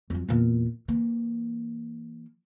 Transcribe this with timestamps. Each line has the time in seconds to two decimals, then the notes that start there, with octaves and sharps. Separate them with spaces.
0.10 F2 F#3
0.29 E2 A#2
0.88 E3 A#3